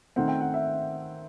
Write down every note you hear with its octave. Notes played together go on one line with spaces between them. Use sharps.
D#3 A3 C4 F#5
G5
F#5
E5